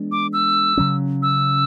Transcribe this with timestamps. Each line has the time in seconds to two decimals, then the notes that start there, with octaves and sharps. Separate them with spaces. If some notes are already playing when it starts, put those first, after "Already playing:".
Already playing: E3 G#3 B3 D4
0.12 D6
0.33 E6
0.77 C#3 F#3 C#4
1.23 E6